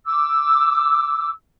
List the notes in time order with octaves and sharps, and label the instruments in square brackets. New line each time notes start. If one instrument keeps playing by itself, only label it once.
[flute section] D6 E6